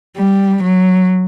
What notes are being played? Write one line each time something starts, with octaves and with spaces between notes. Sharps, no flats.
G3
F#3